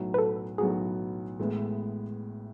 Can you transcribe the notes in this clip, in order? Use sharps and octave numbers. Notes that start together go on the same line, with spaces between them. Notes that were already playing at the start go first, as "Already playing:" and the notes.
Already playing: B1 A2 F#3 B3 F#4
B4
A4
B1 A2 F#3 B3 F#4 G#4
A1 A2 G#3 B3